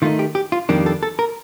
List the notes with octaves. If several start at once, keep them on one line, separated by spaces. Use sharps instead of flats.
D#3 A3 D#4 F4
G4
G4
F4
F2 D#3 G3 A#3 D4 G4
A4
A4
A#4